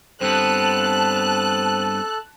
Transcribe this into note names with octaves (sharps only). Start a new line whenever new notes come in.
G2 B3 C4 A4 A5 F#6